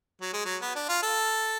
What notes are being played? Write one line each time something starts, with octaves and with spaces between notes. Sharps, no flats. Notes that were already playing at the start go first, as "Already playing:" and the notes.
F#3
G#3
F#3
B3
D4
F4
A4